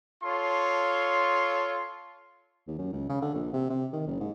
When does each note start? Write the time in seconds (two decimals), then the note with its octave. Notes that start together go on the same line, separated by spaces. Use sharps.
0.24 F4 A4 C#5 C6
2.68 D#2
2.79 F#2
2.93 C#2
3.09 C#3
3.22 D3
3.35 A#1
3.53 C3
3.70 C3
3.93 D#3
4.07 F#1
4.20 G#2